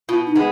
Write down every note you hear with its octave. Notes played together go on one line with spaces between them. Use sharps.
B2 F4
D#4
G#3 B3